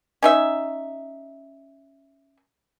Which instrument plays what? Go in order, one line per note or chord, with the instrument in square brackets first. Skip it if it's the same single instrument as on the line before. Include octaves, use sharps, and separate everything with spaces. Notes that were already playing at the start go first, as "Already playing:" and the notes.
[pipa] C#4 D#4 E5